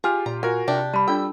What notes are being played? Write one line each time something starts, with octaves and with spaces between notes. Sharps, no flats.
F4 G4 G#4 F6
A#2 A#5
F4 F#4 A#4 G#5
C3 D4 G4
G3 A5 B5
D4 F4 A4 G5 E6